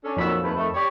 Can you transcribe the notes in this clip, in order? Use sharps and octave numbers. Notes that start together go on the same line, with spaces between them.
C#4 D4 A4
F2 A#2 D#3 F#3 B5 E6
D#2 A3 B4
D#3 A3
G4 C#5 D5